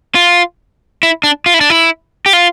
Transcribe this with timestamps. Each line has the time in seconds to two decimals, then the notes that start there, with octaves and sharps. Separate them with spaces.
0.15 F4
1.03 E4
1.24 D4
1.46 F4
1.54 E4
1.61 D4
1.70 E4
2.26 G4
2.33 F4